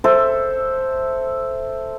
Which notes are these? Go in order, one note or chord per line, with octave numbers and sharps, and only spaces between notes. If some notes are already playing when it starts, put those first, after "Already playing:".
A4 C5 E5